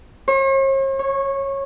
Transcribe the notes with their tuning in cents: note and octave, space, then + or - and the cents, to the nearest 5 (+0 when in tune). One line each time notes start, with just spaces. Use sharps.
C#5 -45
C#5 -15